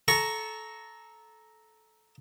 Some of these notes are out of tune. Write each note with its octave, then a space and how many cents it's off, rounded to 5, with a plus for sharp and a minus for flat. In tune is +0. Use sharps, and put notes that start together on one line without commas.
A4 -20 A#5 +0 C#6 +0